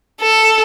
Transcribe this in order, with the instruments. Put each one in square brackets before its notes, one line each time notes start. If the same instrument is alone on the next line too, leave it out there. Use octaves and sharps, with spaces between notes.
[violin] A4